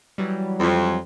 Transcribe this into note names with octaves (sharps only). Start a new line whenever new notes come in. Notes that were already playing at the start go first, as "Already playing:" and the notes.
E3 F#3 G3
F2